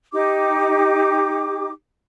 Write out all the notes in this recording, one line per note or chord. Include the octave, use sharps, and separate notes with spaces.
D#4 G4 D6